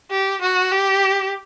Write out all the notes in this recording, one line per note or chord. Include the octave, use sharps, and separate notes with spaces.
G4
F#4
G4